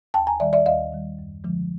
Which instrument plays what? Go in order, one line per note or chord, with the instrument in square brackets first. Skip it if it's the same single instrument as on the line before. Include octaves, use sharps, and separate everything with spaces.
[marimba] D#2 G5 A5
G#5 A#5
D#3 G3 D5 E5
D5 E5
D#2 D#5 F5
D#3 G3
F#2
D3 F3 G#3